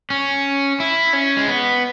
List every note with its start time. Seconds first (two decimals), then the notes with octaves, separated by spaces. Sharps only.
0.10 C#4
0.80 E4
1.13 C#4
1.37 G#3
1.48 B3